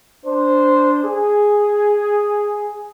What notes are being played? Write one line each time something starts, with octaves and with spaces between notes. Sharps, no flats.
D4 C5
G#4